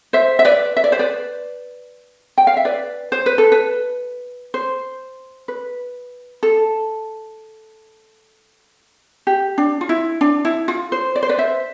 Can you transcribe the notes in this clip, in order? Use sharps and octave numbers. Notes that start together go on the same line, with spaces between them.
C5 E5
E5
B4 D5
E5
D5
C5
B4 D5
G5
F5
E5
B4 D5
C5
B4
A4
B4
C5
B4
A4
G4
D4
F4
E4
D4
E4
F4
C5
D5
C5
B4 D5
C5 E5